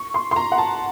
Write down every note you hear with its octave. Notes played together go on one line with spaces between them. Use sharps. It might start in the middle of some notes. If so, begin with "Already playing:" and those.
Already playing: C#6
C6
C6
A#5
F#5
A5